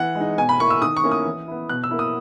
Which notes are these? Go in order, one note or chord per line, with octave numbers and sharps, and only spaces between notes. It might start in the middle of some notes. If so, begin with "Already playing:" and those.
Already playing: E3 F#5
G#3 D#4
B2 G#5
B5
A#3 E4 C#6
E6
D#3 D#6
C#6
A#3 C#4 E4
D#6
E3
B3 E4
B2 F#6
E6
A#3 E4
D#6